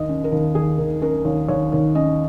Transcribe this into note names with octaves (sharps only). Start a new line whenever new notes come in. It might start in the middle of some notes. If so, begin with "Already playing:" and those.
Already playing: D#2 D#3 D#5
C#4
A#4
D#2
D#2 G#4
D#3 A#4
C#4 A#4
D#2 C#5
D#2 C#5
D#3 C#5
C#4 D#5